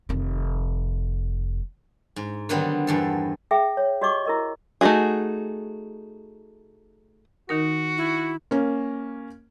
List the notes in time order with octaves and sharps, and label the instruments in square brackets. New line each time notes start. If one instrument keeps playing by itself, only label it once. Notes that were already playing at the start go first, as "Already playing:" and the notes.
[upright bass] F1 D#3
[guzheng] G#2
D3 D#3 F#3 G3 B3 C4
E2 G2 A4
[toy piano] G#4 E5 G5
C#5
F#4 G4 D5 D#5 C#6 D6
E4 A#4 D#5
[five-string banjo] A3 D#4 F4 F#4 G#4
[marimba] D#3 D#4 A#4 [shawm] F#4
[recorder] E4
[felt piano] A#3 C#4